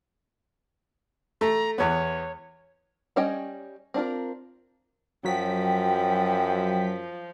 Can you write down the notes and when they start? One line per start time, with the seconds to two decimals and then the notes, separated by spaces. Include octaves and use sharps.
1.41 A3 A#5
1.78 E2 B3 C#5
3.16 G3 C#4 C#5 D#5 G5
3.94 C4 D4 F4 A#4
5.25 F#2 F3 F#3 G5 B6